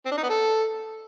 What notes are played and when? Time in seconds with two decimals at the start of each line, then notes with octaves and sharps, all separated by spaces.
0.05 C4
0.11 D4
0.17 D#4
0.23 B3
0.29 A4